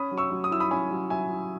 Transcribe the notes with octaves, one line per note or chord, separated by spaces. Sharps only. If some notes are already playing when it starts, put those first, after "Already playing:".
Already playing: C#4 B5 D#6
F#3
C#6 E6
F#3
D#6
E4 E6
B5 D#6
C#4 G#5 B5
F#3
F#3 E5 G#5
E4